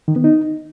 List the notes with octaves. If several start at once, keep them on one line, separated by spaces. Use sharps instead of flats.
D#3
B3
D#4